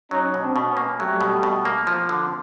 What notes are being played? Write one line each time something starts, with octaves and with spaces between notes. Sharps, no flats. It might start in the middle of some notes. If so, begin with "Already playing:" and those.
F#3 C#4 D#4
B2
C4 D4
B2
B3 C#4
A#3
F#3 G3 A3
B2
B2
A#3
F3
D3